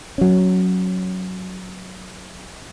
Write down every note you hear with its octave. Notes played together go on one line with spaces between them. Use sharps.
F#3 C#4